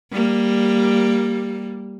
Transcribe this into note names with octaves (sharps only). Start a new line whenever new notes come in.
G3 A#3